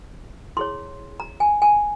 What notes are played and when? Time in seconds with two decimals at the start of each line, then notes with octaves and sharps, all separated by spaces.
0.57 E4 G#4 C#5 C6
1.20 A#5
1.40 G#5
1.62 G#5